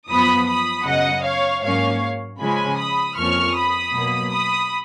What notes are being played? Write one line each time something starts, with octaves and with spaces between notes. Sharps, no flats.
F#2 F3 B3 B5 D#6
B5 D#6
F#2 C#3 F#3 B3 D#5 F#5
C#5 F5
G#2 F#3 A#3 C#4 C#5 F5
C#3 F3 G#3 C#4 G#5 B5
B5 D#6
F2 F3 A#3 C#4 C#6 F6
B5 D#6
B2 F#3 A#3
B5 D#6